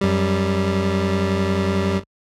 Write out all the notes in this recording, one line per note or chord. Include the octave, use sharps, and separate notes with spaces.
F#2 G3